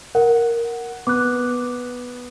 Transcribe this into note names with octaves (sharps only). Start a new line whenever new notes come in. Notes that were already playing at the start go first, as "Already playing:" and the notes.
A#4 F#5
B3 D6 F#6